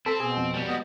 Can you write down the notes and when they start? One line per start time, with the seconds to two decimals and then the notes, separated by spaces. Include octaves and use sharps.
0.06 C4 A4 B5
0.20 B2 G#4
0.37 F2
0.54 F#3 G3
0.68 B3 D#5